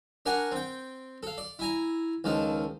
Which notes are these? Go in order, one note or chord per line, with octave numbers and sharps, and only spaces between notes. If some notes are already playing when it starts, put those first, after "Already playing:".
D4 A#4 F#5 G#5 C#6
C4 G5
A4 F5
D5
E4 G#5 A#5
C#2 D#3 F3 A5